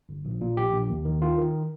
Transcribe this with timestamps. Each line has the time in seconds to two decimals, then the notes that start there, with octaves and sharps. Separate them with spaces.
0.09 G1
0.25 A#1
0.41 A#2
0.57 A#1 G4
0.73 A#1
0.89 D#2
1.05 D#3
1.22 D#3 F4
1.38 D#3